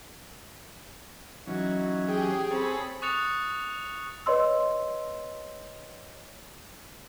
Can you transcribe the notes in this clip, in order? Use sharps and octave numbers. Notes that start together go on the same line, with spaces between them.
E3 F#3 C#4 D#4 F#4
G4 G#4 G5
C4 A4 C#5 B5
C#6 D#6 F#6 A6 C#7 F7
B4 C#5 D#5 C6 E6